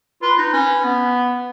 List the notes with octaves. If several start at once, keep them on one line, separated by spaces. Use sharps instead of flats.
F4 B4
D#4
C#4 B4
B3